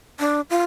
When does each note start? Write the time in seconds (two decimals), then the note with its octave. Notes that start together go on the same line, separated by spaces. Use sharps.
0.19 D4
0.50 F4